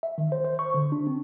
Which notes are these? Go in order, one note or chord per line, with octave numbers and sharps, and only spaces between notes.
E5
D#3
C5
C5
C#6
D3
D4
C4